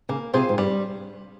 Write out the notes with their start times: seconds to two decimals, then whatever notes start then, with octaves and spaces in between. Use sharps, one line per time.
0.09 C#3 A#3
0.34 C3 F4 G#4 C5
0.49 G#2
0.58 G2 G3